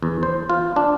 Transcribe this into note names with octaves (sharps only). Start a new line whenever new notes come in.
E2
C5
F4
D4